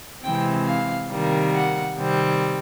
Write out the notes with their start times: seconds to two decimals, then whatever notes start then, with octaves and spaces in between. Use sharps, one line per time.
0.24 C3 E3 G#3 C4 G5
0.67 F5
1.10 C3 D#3 G3 A#3
1.53 F#5
1.97 C3 D#3 G3 C4